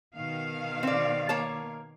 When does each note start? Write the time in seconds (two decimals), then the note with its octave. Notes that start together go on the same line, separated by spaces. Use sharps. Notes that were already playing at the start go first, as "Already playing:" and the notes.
0.15 B2 D#3 F5
0.83 C4 D5
1.29 A#3 C#5 A5